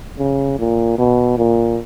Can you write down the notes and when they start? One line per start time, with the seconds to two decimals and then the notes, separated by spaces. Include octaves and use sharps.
0.18 C#3
0.58 A#2
0.98 B2
1.38 A#2